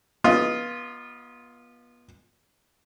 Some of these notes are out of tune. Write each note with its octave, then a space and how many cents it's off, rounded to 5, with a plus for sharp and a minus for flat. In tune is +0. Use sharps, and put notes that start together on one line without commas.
B3 -30 F4 +0 D#5 +15